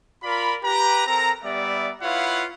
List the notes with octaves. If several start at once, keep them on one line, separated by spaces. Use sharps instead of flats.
F4 A#4 D5 B5
G4 B4 A#5
C4 A4 A#4 A#5
G3 B3 D5 E5
E4 F4 B4 C#5 F5 F#5